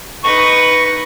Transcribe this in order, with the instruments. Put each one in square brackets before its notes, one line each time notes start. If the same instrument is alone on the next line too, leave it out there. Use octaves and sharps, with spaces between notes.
[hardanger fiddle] D#4 B4 [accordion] C#6